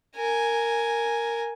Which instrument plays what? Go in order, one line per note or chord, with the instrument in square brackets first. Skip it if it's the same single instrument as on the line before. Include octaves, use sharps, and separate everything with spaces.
[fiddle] A#4 G#5